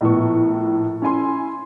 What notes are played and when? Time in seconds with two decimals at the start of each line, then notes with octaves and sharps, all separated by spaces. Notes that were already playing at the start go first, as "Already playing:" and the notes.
0.01 A#1 A2 F3 B3 C#6
1.02 C#4 E4 G#5 C6